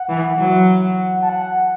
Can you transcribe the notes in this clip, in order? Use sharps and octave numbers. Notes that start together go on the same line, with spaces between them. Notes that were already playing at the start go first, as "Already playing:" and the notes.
Already playing: F#5
E3
F#3
A5
F#5